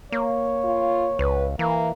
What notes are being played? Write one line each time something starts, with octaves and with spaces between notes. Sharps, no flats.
A#3 C#5
F4
C#2 B4
E3 A#3